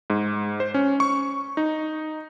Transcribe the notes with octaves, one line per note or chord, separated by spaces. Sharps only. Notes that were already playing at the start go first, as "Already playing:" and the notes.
G#2
C5
C#4
C#6
D#4